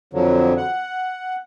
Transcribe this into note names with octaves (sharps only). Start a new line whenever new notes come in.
F2 D3 F3 F#3
F#5